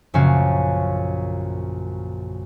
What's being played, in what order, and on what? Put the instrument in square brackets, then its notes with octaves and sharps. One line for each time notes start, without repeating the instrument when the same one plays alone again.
[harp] A#1 F#2 C#3 C#4 F#4 F5